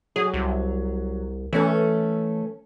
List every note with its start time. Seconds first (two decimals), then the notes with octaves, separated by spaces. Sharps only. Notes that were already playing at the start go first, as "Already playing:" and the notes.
0.16 F#3 G#4
0.34 C2
1.53 E3 A3 C#4 A4